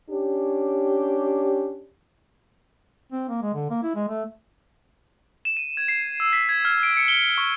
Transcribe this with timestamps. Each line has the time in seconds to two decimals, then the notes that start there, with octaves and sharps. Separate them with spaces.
0.10 C#4 D4 G4
3.12 C4
3.29 A#3
3.42 G#3
3.54 D3
3.71 A#3
3.83 E4
3.95 G#3
4.09 A3
5.45 E7
5.57 D#7
5.77 G#6
5.88 C7
6.20 E6
6.33 B6
6.49 G#6
6.65 F6
6.83 D7
6.97 C#7
7.08 G7
7.38 C#6